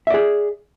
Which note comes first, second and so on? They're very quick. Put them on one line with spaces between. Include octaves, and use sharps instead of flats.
E5 D5 G#4